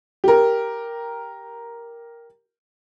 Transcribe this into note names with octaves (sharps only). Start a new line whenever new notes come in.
G4 A#4